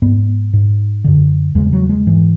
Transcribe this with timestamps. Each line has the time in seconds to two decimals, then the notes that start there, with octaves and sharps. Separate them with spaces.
0.02 G#2 B3
0.53 G#2
1.04 F#2 D3
1.55 E2 C#3 G#3
1.73 F#3
1.89 G#3
2.07 G#2 E3